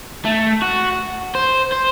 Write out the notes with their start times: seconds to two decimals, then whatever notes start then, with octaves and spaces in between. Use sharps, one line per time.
0.25 A3
0.62 F#4
1.35 C5
1.72 C5